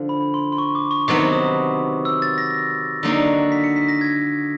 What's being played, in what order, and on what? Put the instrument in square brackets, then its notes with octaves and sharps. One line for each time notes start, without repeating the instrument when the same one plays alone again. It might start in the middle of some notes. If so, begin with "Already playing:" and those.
Already playing: [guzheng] D3 F3
[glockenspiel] B5
C6
C6
C#6
D6
C#6
[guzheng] C3 D#3 F#3 B3 [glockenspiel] D6
[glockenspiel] D#6
E6
A6
A#6
[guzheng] D3 F#3 A#3 D#4 F#4
[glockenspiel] B6
C#7
B6
A#6
G#6